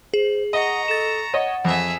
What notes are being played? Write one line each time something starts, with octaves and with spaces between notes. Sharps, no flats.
G#4 C5
D#5 F#5 A#5 C#6
A4 A6 E7
C#5 D#5 F#5
F2 G#4 E5